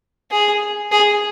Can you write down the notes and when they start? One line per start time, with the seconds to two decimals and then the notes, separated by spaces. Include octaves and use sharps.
0.31 G#4
0.92 G#4